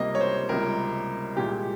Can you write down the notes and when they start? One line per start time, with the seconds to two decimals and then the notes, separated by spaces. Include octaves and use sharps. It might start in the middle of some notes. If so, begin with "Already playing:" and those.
Already playing: C#2 C3 G3 A#3 D#5
0.15 C#5
0.21 C5
0.49 C#2 C3 G3 A#3 A#4
1.36 C2 A#2 G#3 G4